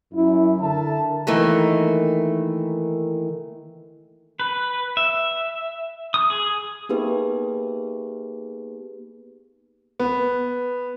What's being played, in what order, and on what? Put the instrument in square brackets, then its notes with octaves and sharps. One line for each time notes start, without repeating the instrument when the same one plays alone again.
[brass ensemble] F#2 E4
D3 A#4 E5 A5
[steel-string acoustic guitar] D#3 E3 A3 A#3
[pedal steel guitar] B4
E5
D#6
G#4
[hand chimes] A#3 B3 D#4 G4 G#4 B4
[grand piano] B3